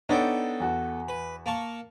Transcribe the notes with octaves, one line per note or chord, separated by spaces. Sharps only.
B3 D4 D#4 A4 C#5 G5
E2 F#4
B4
A#3 A5 C#6